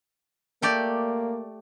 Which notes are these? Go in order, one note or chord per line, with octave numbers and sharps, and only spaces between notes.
A3 A#3 G4 D5